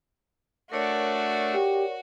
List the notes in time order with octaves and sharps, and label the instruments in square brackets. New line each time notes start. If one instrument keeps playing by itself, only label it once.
[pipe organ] A3 D4 [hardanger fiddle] F#4 [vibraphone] A#4 C#5 D5
[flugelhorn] G4